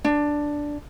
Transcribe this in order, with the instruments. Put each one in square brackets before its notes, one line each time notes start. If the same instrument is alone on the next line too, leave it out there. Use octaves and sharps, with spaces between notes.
[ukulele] D4